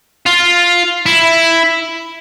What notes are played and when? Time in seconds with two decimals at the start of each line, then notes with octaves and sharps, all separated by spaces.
0.26 F4
1.06 E4